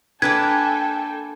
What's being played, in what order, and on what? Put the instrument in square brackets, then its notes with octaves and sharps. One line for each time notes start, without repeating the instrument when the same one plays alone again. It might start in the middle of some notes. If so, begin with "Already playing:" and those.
[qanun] A#3 D4 B4 [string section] A4 G5 G#5 [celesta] G#6